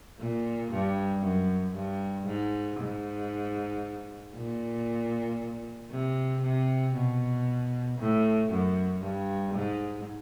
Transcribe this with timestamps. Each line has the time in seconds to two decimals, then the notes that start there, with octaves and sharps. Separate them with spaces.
0.20 A#2
0.72 G2
1.23 F#2
1.75 G2
2.27 G#2
2.80 G#2
4.35 A#2
5.90 C3
6.42 C3
6.95 B2
7.99 A2
8.51 F#2
9.02 G2
9.55 G#2